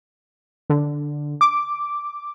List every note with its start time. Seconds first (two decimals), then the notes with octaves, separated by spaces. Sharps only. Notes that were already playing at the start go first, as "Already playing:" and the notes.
0.70 D3
1.41 D6